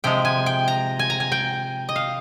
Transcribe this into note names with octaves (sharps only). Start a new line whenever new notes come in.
C3 F3 G#3 G5
G#5
G5
A#5
G#5
A#5
G#5
G5
D#5
F5